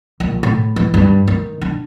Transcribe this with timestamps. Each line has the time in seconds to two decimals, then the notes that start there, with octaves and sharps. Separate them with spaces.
0.20 A#1
0.43 A2
0.76 E3
0.94 G2
1.28 D#3
1.61 D4